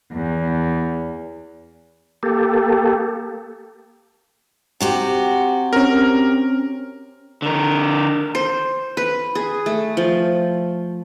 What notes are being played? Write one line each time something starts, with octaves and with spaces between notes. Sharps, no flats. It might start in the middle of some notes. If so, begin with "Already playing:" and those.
E2
A#3 G4 A4
C3 F#4 G4
C4 C#4 A#4
D3 A#4
C5
B4
G#4
A3
F3